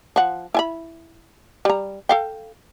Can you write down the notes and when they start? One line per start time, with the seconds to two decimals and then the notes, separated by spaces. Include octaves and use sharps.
0.16 F3 F#5
0.54 E4 G#5 B5
1.65 G3 A#5
2.09 A4 F5 G5